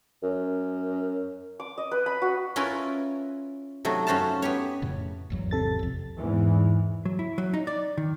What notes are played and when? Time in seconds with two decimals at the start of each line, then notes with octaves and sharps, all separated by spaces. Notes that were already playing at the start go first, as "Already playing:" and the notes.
0.23 F#2
1.60 D6
1.78 D#5
1.91 B4
2.06 B5
2.22 F#4
2.56 C#4 E4 F4 A#4 B4
3.85 C3 F#3 A3 D#4
4.07 F#2 C#4 F#4 C5 F5 A5
4.42 B3 G4 C#5
4.82 F2 A2 C#3
5.30 G#1 E2 F#3
5.51 C3 A4 A6
5.79 B1 F2
6.17 E2 G#2 E3
7.05 F#3
7.19 E4
7.38 F#3
7.54 D#4
7.67 D5
7.98 D#3